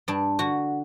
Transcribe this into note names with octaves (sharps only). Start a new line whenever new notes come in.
G2 D4
D3 F#4